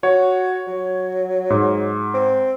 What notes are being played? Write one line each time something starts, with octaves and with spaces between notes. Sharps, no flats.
F#4 C#5
F#3
G#2
C4